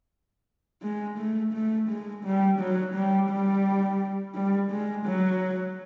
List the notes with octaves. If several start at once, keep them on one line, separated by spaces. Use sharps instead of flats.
G#3
A3
A3
G#3
G3
F#3
G3
G3
G3
G#3
F#3